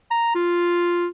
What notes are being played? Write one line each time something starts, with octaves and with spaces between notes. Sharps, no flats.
A#5
F4